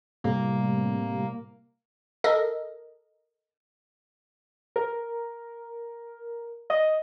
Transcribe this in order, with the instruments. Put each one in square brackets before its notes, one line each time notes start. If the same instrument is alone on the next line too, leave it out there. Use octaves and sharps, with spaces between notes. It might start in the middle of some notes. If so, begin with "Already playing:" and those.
[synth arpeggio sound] A2 C3 G3 [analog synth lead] A#3
[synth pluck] A4 A#4 D#5
[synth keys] A#4
D#5